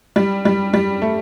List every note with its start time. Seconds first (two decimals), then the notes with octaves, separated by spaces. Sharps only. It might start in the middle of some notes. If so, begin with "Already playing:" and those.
0.16 G3
0.45 G3
0.74 G3
1.02 A3